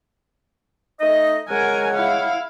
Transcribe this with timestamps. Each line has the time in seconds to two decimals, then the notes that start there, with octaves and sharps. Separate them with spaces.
1.00 A3 D#4 D#5
1.50 C#3 G#3 A#4 F#5 G#5
1.95 E4 F5